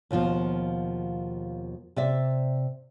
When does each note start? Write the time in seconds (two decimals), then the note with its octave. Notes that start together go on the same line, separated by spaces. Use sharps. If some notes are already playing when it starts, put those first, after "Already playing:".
0.11 D#2 B2 F3 F4
1.96 C3 D5 E5